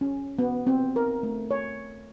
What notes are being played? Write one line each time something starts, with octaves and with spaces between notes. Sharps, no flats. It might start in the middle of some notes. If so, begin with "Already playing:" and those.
C#4
B3
C4
A#4
A3
C#5